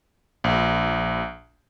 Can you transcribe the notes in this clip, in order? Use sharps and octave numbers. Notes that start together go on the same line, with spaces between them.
A#1